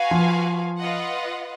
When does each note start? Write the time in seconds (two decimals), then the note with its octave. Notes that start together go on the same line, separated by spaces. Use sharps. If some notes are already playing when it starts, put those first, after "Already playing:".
Already playing: F#4 B4 F5 G#5
0.11 F3
0.79 F4 B4 D#5 F#5